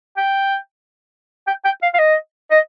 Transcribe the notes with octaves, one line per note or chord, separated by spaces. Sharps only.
G5
G5
G5
F5
F5
D#5
D#5